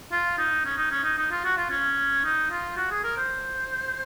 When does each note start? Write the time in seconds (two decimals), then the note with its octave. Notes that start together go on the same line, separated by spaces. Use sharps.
0.12 F4
0.38 D#4
0.65 C#4
0.77 D#4
0.91 C#4
1.04 D#4
1.18 D#4
1.31 F4
1.44 F#4
1.57 F4
1.70 C#4
2.24 D#4
2.51 F4
2.77 F#4
2.91 G#4
3.04 A#4
3.18 C5